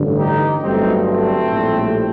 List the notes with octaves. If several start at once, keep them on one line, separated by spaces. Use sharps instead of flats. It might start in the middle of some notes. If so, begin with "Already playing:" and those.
Already playing: A1 G2 D3
D#4 G4
G1 G2 F#3 A3 C4 D#4
A3 C4
A#1 A2 G3